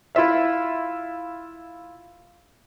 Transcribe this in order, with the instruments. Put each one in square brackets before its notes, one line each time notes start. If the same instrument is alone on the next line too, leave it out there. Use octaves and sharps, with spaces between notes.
[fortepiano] E4 F4 E5 F5